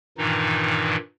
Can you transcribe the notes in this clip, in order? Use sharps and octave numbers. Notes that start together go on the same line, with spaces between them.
G2 A#2 D#3 E3 D#4